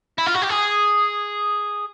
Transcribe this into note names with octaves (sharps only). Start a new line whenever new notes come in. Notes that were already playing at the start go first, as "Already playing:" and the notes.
E4
F4
F#4
G4
G#4